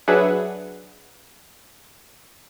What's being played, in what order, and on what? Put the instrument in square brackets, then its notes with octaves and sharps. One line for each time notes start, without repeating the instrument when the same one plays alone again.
[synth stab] F#3 D4 G#4 B4 E5 F#5